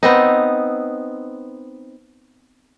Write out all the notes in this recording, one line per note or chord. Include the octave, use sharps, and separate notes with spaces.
B3 C4 D#4